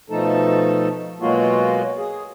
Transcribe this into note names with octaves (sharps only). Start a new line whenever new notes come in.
B2 F3 A3 D#4 A4
B2 F#3 G#3 A#3 F4 F#4
G#4